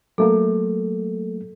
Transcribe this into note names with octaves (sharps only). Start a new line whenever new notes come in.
F#3 A3 A#3 A4